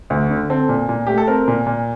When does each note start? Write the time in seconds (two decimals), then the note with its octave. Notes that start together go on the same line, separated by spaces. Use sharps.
0.10 D2
0.30 D3
0.50 C4 A4
0.69 A#2
0.89 A#2
1.07 A3 G4
1.18 A4
1.27 C4 A#4
1.48 A#2
1.67 A#2